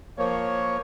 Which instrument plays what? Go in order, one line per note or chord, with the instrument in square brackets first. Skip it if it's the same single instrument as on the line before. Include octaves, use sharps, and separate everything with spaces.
[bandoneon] F3 A#3 [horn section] C#5